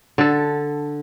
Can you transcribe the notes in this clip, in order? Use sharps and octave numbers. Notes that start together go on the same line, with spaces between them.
D3 A4